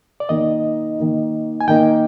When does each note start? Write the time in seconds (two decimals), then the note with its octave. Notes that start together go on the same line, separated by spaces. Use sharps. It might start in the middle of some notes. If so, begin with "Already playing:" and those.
0.20 D5
0.29 D#3 A#3 D#4 D#5
0.98 D#3 A#3 D#4
1.61 G#5
1.68 D#3 A#3 D#4 G5